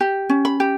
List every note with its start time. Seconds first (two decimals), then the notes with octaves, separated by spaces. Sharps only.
0.01 G4
0.29 C#4
0.45 B5
0.60 G4